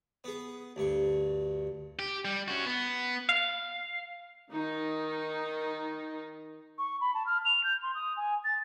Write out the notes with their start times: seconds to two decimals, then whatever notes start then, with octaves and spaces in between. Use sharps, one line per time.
0.24 B3 G#4
0.76 D2 G2 C#6
1.99 G4
2.25 G3
2.48 C#4 F#4
2.66 B3
3.29 F5
4.52 D#3 D#4
6.78 C#6
7.01 B5
7.14 A5
7.26 F6
7.45 F7
7.64 G6
7.83 C6
7.95 D#6
8.17 G#5
8.44 A6